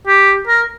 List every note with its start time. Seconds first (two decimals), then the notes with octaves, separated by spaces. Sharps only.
0.07 G4
0.48 A#4